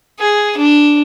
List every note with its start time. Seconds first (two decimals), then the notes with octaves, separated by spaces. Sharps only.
0.20 G#4
0.57 D4